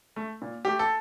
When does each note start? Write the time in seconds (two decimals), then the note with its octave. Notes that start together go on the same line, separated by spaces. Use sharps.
0.16 A3
0.42 A#2
0.65 A3 G4
0.79 A4